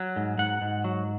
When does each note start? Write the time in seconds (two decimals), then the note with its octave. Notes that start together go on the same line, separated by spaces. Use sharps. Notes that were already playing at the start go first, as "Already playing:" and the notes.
Already playing: F#3
0.16 G#2
0.38 G#2 F#5
0.61 G#2
0.84 F#3